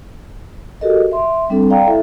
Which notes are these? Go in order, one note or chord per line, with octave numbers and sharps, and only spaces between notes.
F#4 G4 A4 A#4 D#5
E5 C6
G3 C4 D4 A4
D5 F5 G5 A#5
E4 A4 E5